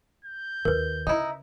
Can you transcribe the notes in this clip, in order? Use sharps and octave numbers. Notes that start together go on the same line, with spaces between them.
G6
D#2 A#4 B4
C#3 D#4 E4